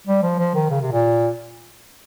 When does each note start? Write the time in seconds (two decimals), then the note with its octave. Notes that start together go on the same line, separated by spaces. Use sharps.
0.07 G3
0.23 F3
0.39 F3
0.55 D#3
0.70 C#3
0.81 C3
0.92 A#2